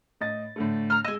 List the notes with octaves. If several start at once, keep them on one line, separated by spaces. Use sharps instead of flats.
A2 D#5 A6
A2 D3 A3
A#5 F6
G#3 D#5 G#5 E6